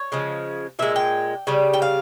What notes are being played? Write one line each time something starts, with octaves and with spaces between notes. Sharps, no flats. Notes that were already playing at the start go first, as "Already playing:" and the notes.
Already playing: C#5
C#3 F3 G#3
A#2 G#3 E5
G5
C#3 G3
G5
F5